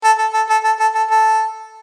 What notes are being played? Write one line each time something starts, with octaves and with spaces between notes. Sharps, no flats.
A4
A4
A4
A4
A4
A4
A4
A4